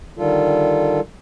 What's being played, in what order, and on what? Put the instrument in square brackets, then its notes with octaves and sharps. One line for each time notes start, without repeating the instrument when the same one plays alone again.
[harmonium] D3 D#3 G3 F4 A4